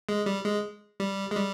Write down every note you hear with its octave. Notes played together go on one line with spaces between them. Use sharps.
G#3
G3
G#3
G3
G#3
G3